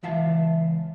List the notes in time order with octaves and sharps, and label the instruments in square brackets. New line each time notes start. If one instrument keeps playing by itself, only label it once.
[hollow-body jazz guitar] C#2 E3 E5 F5 A5